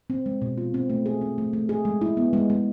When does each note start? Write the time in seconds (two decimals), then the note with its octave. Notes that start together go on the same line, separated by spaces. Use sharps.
0.10 C4
0.26 G#3
0.42 B2
0.58 F4
0.74 C4
0.90 A3
1.06 G#4
1.21 C4
1.38 A3
1.53 A3
1.69 G#4
1.85 G#3
2.01 E4
2.17 B3
2.33 G#3
2.50 G#3